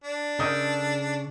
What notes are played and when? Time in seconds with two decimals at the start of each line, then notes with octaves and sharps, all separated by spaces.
0.04 D4
0.39 C#3 A4 A#4 D#5 G5